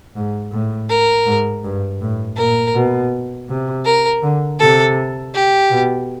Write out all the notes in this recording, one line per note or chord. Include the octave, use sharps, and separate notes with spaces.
G#2
A2
A#4
G#2
G2
A2
A#2 A#4
B2
C3
A#4
D3
C3 A4
G4
B2